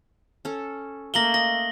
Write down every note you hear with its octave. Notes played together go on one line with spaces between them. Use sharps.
C#4 A4
A3 A#3 F5 A#6 F#7 G7
D#5 A#6